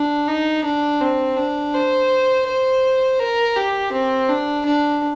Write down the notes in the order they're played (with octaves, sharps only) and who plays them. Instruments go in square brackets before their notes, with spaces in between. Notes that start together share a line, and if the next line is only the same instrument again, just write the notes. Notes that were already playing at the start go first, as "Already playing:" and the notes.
Already playing: [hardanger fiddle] D4
D#4
D4
C4
D4
C5
C5
A#4
G4
C4
D4
D4